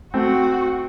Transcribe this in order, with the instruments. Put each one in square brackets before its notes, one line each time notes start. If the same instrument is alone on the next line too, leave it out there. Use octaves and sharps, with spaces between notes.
[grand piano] A3 C4 [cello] F#4